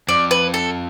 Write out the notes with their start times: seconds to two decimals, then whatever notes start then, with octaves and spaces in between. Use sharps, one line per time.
0.08 F2 D5
0.31 B4
0.54 A4